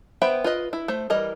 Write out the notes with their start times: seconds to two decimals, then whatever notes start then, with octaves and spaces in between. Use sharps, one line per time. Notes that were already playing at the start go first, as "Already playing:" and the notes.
0.22 B3 C5 E5 G5 B5
0.44 F4 B4 D#5
0.73 E4
0.88 A3 C5
1.10 E3 G3 A#4 D#5